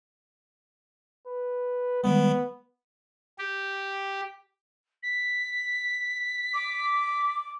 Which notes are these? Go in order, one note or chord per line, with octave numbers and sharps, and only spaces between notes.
B4
D#3 G3 G#3 B3
G4
B6
D6